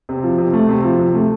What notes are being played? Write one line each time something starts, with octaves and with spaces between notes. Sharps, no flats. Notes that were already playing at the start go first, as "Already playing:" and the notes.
C3
F3
C3
A3
C3
F3
C3
A3